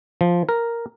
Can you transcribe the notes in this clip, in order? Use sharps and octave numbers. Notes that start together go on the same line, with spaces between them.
F3
A#4